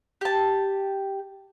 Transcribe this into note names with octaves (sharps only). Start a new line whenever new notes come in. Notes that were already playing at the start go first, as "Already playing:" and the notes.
G4 A5